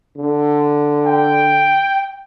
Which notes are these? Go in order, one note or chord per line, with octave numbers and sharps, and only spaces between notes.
D3
G5